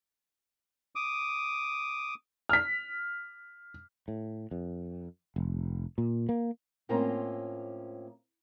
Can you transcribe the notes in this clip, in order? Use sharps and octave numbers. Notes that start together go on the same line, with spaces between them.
D6 D#6
F6 B6
A2
F2
F1
A#2
A#3
A2 A#3 C4 C#4 F4 A#5